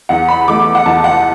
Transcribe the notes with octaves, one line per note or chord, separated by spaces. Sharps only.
E2 F#5
B5
E3 A3 D6
F#5
E2 A5
F#5